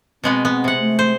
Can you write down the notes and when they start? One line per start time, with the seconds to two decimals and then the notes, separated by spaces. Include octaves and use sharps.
0.24 B2 G#3 B3 C4
0.45 B3
0.64 C3 F#5
0.80 A3
0.99 C5